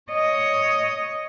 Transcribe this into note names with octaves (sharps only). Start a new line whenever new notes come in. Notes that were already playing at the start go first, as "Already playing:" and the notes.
C#5 D#5